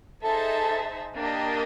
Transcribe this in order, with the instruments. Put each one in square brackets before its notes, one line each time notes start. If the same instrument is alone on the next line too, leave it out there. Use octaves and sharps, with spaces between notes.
[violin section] D#4 G#4 C5 E5 A5 [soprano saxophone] A4
[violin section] A#3 D4 G4 A#4 D#5